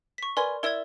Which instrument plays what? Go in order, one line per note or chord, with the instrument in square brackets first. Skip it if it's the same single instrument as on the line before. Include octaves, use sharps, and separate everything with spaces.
[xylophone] C#6 B6
[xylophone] A#4 D5 C6 [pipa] B4 G#5
[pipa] E4 E5 [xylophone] A#4 D5 G#6